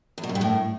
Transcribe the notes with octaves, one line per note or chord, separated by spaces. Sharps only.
E2
B2
F#2
G2
A2